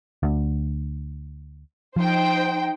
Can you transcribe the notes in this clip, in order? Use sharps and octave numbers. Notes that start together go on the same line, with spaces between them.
D2
F3 D#4 C5 G5